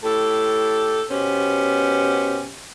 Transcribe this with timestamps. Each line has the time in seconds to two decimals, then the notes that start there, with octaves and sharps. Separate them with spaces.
0.04 A2 G4 A4
1.10 B2 B3 C#4 G4 C5